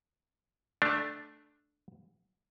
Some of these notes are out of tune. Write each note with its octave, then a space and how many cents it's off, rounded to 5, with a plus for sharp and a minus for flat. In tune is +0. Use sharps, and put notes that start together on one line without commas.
A3 -5 D4 +5